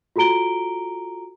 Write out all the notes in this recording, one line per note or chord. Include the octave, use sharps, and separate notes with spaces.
F4 F#4 A4 A#5 D7 G7